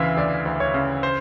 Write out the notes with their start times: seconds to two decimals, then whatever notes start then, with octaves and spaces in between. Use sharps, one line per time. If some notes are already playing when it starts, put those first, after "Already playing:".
Already playing: D2 C#3 E3 E5 F5
0.17 D2 D5
0.45 D2
0.60 C#5
0.74 C#3
1.03 C5